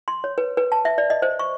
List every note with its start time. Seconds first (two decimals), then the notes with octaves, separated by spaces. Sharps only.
0.08 C6
0.24 C#5
0.38 B4
0.57 B4
0.72 A5
0.85 E5
0.98 D5
1.10 D#5
1.22 C5
1.39 C#6